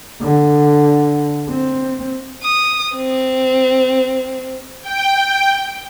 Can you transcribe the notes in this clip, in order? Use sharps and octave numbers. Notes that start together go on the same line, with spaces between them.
D3
C4
D#6
C4
G5